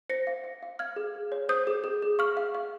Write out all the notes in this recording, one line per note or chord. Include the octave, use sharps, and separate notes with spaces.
C5 A#6 C#7
F5
F5
F5
F5 F6 G#6
G#4
G#4
C#5
C5 D#6 G6
G#4
G#4
G#4
F5 C#6 F6
F5
F5